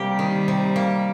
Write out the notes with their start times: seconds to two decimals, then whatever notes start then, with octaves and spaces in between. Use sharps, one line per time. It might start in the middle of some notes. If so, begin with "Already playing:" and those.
Already playing: C3 G3 A#3 G4
0.19 D#3
0.48 C3
0.76 A#3